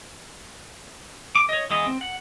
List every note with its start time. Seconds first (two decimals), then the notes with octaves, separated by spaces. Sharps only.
1.36 D6
1.49 C#5 D#5
1.70 E3 G#3 B3 D#5
1.86 C4
2.01 F#5